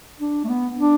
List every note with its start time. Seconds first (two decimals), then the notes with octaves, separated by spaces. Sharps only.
0.20 D4
0.44 A3
0.49 B3
0.78 D4